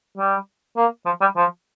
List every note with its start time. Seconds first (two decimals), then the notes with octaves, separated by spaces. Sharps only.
0.18 G3
0.77 A#3
1.06 F3
1.21 G3
1.36 F3